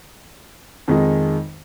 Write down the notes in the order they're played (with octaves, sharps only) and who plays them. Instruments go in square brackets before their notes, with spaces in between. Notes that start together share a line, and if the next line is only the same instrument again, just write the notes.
[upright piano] F2 D#3 G#3 D#4